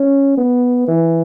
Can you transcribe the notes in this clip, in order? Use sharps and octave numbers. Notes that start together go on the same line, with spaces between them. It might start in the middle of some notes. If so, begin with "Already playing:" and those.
Already playing: C#4
B3
E3